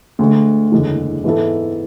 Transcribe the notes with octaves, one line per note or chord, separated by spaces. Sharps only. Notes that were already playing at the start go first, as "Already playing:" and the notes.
D2 D3 G#3
F#1 E2 D3 G#3
G#2 E3 B3 E4 A4